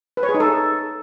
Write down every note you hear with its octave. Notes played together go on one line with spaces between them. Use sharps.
B4
C#5
G#4
D#4
A4